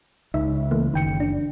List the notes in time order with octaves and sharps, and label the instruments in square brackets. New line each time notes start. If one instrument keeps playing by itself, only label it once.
[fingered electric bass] C#2 [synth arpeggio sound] D#4 E5
[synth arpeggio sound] E3 A3 A#3
[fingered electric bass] F#1 [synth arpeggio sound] D#3 G5 C#7
[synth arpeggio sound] D4